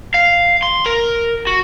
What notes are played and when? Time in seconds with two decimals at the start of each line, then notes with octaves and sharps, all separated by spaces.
0.14 F5
0.63 C6
0.86 A#4
1.47 F#4